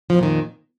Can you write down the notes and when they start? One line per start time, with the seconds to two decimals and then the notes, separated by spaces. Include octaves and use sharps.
0.10 F3
0.14 F2
0.18 A#2
0.23 D#3